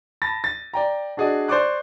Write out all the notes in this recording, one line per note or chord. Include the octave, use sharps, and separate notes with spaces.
A5 B5 A6 A#6
A6
D5 G5 A#5
D4 F#4 G#4 D5 D#5
C5 D5 C#6 D6 F#6